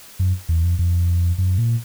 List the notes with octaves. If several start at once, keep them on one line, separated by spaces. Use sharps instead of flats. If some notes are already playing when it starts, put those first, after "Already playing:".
F#2
E2
F2
F2
F#2
A#2